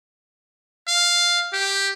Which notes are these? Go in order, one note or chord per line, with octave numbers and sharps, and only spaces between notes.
F5
G4